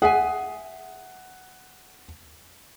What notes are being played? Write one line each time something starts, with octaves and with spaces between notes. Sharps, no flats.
G#4 E5 F#5 G#5